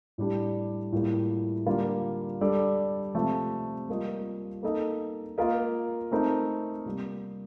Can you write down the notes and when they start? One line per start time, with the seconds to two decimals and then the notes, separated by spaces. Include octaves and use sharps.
0.18 A2 G3 D4 G4
0.93 A2 G3 A#3 F4
1.66 D3 G3 A#3 F4
2.41 G3 D4 A4 D5
3.15 C3 F3 A3
3.89 G3 A#3 F4 A#4 D#5
4.63 A#3 D#4 A4 D#5
5.38 A#3 F4 A#4 D#5
6.11 A3 C4 D#4 A#4
6.85 C3 G3 A#3